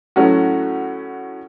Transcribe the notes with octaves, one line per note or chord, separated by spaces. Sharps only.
A2 F#3 A3 C#4 F#4